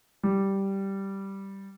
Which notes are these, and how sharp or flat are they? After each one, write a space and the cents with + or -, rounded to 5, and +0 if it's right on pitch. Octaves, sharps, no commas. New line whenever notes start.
G3 -5